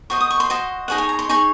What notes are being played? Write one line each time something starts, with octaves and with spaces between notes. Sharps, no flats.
F#4 C5 D#5 C#6
D#6
C#6
C6
F#4 C5 D#5
D#4 G#4 C#5 F#5
G#5
A#5
C6
D#4 G#4 C#5 C#6